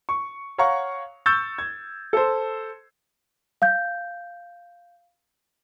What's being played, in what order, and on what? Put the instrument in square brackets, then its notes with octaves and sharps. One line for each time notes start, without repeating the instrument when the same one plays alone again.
[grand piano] C#6
C#5 F5 F#5 A#5 C#6
C#6 E6 G6 A6
G#6
A4 C5
[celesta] F5 G6